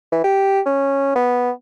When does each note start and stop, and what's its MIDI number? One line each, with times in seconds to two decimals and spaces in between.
0.12 0.22 52
0.24 0.60 67
0.66 1.14 61
1.15 1.51 59